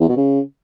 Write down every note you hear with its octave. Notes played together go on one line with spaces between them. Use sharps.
E2
B2
C#3